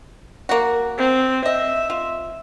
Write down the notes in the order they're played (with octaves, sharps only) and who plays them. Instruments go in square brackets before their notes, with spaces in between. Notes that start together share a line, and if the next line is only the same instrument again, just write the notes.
[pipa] A#3 F#4
[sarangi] C4
[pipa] D#5 [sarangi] E5
[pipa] F4